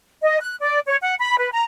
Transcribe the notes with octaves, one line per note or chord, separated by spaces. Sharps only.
D#5
F#6
D5
C#5
F#5
B5
B4
A#5